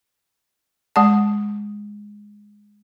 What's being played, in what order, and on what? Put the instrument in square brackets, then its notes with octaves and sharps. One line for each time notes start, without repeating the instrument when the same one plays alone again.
[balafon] G#3 F#5 A5